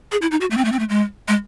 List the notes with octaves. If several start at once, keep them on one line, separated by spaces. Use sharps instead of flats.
G#4
E4
D#4
F#4
A3
C4
A3
C4
A3
G#3
G#3